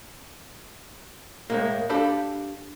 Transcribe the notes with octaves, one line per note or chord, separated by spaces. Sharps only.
A2 G#3 A#3
D4 G4 A4 F5 B5